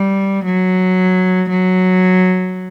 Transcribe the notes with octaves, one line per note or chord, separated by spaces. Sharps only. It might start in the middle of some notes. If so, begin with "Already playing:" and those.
Already playing: G3
F#3
F#3